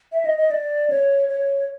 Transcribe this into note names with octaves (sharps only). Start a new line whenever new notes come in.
E5
D#5
D#5
D5
C#5
C#5